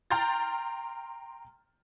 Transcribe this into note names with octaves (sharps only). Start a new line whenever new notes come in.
G5 A#5 C6 F6 G6 A6